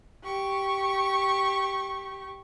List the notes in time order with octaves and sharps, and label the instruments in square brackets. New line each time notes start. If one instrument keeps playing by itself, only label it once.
[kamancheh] G4 C#6